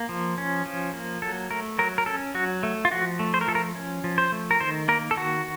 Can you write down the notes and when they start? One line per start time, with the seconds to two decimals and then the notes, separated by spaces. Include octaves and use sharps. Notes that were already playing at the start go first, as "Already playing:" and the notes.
Already playing: A#3
0.09 F3
0.38 C#4
0.66 F3
0.93 A#3
1.22 F#3 A4
1.50 A3 A#4
1.79 F#3 A#4
1.98 A#4
2.06 C#4 A4
2.35 F#3 F#4
2.63 A3
2.85 F4
2.91 F3 F#4
3.19 A3
3.34 C5
3.41 A#4
3.48 F3 A4
3.55 A#4
3.76 C#4
4.04 F3
4.18 C5
4.32 A3
4.51 A#4
4.60 D#3 C5
4.88 A#3 A#4
5.11 A4
5.16 D#3 F#4